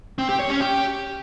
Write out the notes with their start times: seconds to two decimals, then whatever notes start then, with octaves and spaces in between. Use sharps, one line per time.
0.18 C4
0.29 G4
0.39 C#5
0.50 C#4
0.60 G4